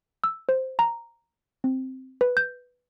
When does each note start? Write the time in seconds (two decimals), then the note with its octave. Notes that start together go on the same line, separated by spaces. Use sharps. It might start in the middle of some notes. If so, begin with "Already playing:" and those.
0.24 E6
0.49 C5
0.79 A#5
1.64 C4
2.21 B4
2.37 G6